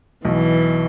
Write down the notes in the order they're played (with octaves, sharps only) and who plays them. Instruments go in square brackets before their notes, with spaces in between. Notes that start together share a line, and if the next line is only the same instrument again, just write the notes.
[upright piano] B1 B2 [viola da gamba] E3